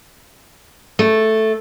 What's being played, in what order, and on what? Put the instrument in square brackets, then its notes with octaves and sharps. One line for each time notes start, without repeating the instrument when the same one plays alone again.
[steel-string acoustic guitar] A3